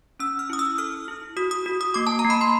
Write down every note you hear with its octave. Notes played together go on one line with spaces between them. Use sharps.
C#4 E6
F6
E4 D#6
E6
A4 F6
E4
F#4 D#6
D#6
F#4
D#6
A#3 D6
A5
A#5
A#3
B5
C6